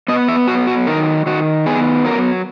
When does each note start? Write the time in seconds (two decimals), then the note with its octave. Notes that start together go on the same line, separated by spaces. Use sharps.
0.08 B3 D#5
0.28 E5
0.48 F#3 F#4
0.67 F#4
0.87 D#3 A#4
1.26 D#3 F#4
1.66 B3 G#4
2.05 F#3 A#4